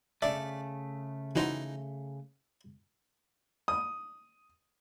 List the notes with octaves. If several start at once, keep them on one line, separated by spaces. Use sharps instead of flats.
C#3 A3 D4 D5 E5
E3 D#4 F#4 C5 F#5
D#6